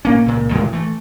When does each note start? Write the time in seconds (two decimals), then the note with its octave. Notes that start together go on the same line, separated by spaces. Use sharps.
0.05 A#2 A#3 C#4
0.26 C#2 A#2
0.51 A2 D#3 G#3 A3
0.73 E3 A3